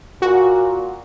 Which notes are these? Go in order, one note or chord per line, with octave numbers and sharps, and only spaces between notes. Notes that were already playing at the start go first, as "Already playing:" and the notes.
A#2 F#4